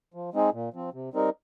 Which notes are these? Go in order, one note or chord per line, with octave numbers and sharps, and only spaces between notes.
F3
G#3 C4 D#4 G#4
A#2
F3 C4
C3
G3 C4 D#4 A#4